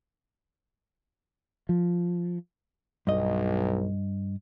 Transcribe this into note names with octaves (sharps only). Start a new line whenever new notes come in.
F3
B1 G2 D#5